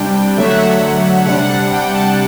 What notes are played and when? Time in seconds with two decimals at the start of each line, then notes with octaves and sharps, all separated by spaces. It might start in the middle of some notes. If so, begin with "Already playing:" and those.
Already playing: C3 G3 D4 G5
0.37 D3 F#3 A3 E5
0.47 F#5
0.57 E5
1.26 C3 G3 D4 F#5
1.49 F#5
1.71 G5
1.93 A5